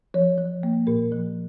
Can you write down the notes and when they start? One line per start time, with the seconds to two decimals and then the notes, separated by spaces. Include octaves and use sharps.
0.14 F3 C#5
0.38 F3
0.63 A#3
0.87 A#2 A#4
1.12 F3